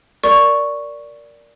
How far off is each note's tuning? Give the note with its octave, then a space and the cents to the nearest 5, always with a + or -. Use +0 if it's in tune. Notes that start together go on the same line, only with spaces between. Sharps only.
A#4 +0 D5 -10 C#6 +0